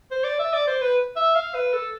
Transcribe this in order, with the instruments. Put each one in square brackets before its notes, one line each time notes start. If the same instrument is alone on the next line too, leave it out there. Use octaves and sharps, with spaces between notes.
[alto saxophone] C5
D5
E5
D5
C5
B4
E5
F5
B4
A4